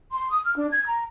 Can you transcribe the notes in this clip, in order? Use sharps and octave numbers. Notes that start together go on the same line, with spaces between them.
C6
D#6
F6
D4
G#6
A#5